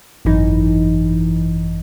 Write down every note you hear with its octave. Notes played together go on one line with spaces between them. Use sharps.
G#1 F#2 E3 D#4